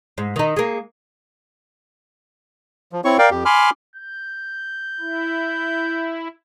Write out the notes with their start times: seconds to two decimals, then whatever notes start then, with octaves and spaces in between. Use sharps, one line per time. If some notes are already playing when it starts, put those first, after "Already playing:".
0.18 G#2
0.36 D#3 D#4
0.57 G#3 A#3
2.92 F3
3.05 C4 E4 C#5 C#6
3.18 A#4 D5 F5 G5
3.31 F2 G4
3.45 G#5 B5 C6 D6 F6
3.96 G6
5.00 E4